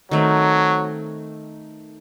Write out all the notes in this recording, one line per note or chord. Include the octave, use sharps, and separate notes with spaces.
D#3 F#3 A3 C4